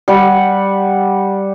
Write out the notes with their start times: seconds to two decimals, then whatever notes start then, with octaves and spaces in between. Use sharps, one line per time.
0.08 G3 F#5